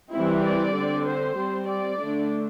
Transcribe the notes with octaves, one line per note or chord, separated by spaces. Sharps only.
E3 G3 C4 E4
D5
D3 C4
C5
G3 C4
D5
D3 A3 D4